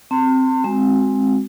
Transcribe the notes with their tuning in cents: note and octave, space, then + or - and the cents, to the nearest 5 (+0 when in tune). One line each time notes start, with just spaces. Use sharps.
C4 +0 A5 +45 C6 +0
G#3 -15 C4 +10 F#4 +0